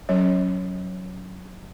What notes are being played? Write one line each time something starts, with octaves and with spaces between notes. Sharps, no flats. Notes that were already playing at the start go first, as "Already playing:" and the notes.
F#3 C#4 C#5